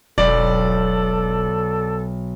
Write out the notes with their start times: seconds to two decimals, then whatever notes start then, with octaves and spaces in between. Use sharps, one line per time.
0.18 E1 B1 A4 D5